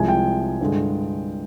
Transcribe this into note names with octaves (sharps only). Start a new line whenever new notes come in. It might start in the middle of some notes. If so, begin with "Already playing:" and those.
Already playing: C2 C3 F3 G#3 G#5
G5
G2 D3 G#3